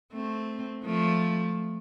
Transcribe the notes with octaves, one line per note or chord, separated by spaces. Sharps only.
A3 C4
F3 A3